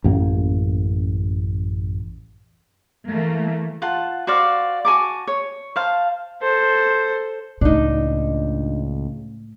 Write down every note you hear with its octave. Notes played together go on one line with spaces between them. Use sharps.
A1 F#2 A#3
E3 A3 A#3
F4 F#5 A5
F#4 C5 D5 F5
F#4 G#5 A5 D6
C#5
C5 F5 A5
A4 C5
C#2 A2 D4 D#4